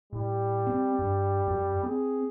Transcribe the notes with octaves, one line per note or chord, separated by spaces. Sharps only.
A2 G3
C4
G2
F#2
C4 G#4